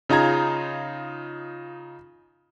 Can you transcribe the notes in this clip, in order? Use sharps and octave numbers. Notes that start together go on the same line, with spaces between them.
C#3 D#4 F4 A#5 G#6